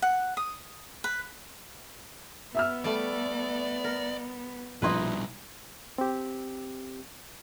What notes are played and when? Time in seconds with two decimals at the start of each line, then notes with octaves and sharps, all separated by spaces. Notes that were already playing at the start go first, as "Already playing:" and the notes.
0.02 F#5
0.37 D#6
1.04 B4
2.55 B3 E5 E6 F6
2.85 G3 A3 D5
3.84 A#4
4.82 A#1 B2 G3 D#4 E4 B4 C6
5.98 C4 G4